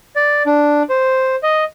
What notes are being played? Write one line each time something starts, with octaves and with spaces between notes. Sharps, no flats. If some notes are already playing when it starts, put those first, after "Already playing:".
D5
D4
C5
D#5